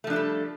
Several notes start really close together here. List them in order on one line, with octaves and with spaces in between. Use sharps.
A3 F3 D4 A4 G3